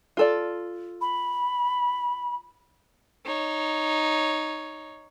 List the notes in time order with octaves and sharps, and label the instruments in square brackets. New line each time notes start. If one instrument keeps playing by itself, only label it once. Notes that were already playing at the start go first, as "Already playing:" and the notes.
[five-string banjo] F4 A4 D5
[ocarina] B5
[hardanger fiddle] D#4 C#5